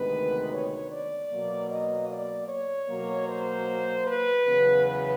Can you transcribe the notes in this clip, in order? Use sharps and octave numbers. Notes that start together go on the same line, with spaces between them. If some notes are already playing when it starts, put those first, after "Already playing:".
Already playing: D2 C3 D#3 G#3 B3 B4
C#5
D5
B2 F#3 A#3
D#5
D5
C#5
B2 F#3 A#3
C5
B4
E2 C#3 F#3 B3
B4